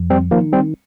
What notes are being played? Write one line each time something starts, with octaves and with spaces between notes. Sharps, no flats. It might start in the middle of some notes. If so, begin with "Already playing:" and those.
Already playing: F2
G3 C4
D#3 F3 A#3
G3 C4